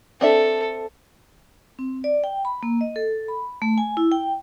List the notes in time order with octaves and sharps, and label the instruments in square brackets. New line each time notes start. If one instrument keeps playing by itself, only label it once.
[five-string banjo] C4 D4 E5 [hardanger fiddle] A4
[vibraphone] C4
D5
G5
B5
A#3
D#5
A4
B5
A3
G#5
E4
G5